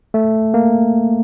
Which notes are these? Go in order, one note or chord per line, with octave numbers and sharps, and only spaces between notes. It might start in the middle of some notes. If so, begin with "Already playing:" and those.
A3
A#3